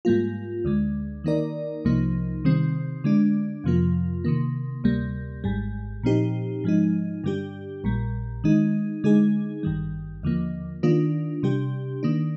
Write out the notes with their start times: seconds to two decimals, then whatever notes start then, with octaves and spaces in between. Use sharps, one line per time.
0.05 G#2 G3 A#3 F4
0.65 D2 D3 G#3
1.24 D#3 A#3 D#4 A#4 D5
1.85 C2 C3 F3 A#3 D#4
2.44 C3 D#3 G3 C4
3.04 D3 G#3 D4
3.64 F2 C3 F3 A#3 F4
4.25 C3 D#3 A#3
4.84 D2 C3 G3 A#3
5.44 G#1 G#2 G3
6.03 A#2 F3 C4 D#4 G4
6.64 G#2 F3 G#3 D#4
7.24 G2 D3 G3 D4 G4
7.84 A#1 A#2 G3
8.44 D#3 G#3 D#4
9.04 D3 G#3 D#4 G#4
9.63 G#1 G2 D#3 G3
10.23 D#2 D3 F3 A#3
10.83 D#3 A#3 D4 F4
11.43 C3 G3 D4 G4
12.03 D#3 A#3 D4